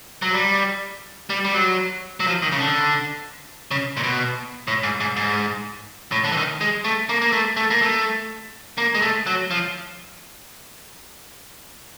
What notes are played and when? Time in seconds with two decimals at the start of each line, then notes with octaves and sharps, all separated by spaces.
0.22 F#3
0.33 G3
1.30 G3
1.45 G3
1.54 F#3
2.20 F#3
2.27 F3
2.42 D#3
2.52 C#3
2.59 D3
3.71 C#3
3.97 A#2
4.03 B2
4.68 A2
4.83 G#2
5.00 G#2
5.16 G#2
6.12 A2
6.24 D3
6.32 E3
6.37 D#3
6.61 G#3
6.84 A3
7.09 A#3
7.22 A#3
7.33 A3
7.57 A3
7.70 A#3
7.82 A3
8.78 A#3
8.95 G#3
9.02 A3
9.26 F#3
9.51 F3